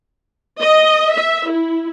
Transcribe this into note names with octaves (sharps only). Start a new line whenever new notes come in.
D#5
E5
E4